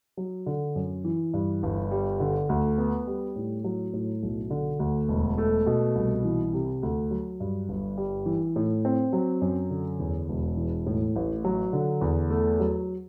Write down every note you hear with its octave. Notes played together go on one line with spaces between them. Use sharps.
F#3
D3
F#2
E3
G2
G1
G3
D3
D2
B3
G3
A2
F#3
A2
B1
D3
D2
E1
A3
B2
C2
E3
C3
D2
F#3
G2
G1
G3
E3
A2
C4
F#3
F#2
D3
E2
E1
E3
A2
A1
F#3
D3
E2
A3
F#3